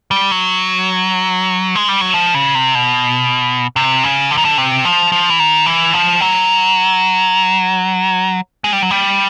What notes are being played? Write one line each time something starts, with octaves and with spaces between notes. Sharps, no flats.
G3
F#3
G#3
G3
F#3
F3
C#3
C3
B2
C3
C#3
D3
D#3
D3
C3
F3
F3
E3
D#3
E3
F3
F#3
G#3
G3
F#3
G3